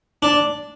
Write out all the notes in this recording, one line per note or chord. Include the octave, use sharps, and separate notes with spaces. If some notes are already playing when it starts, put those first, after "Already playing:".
D4